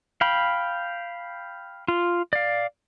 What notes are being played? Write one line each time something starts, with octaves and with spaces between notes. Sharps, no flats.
F5 G5 B5
F4
D5 F5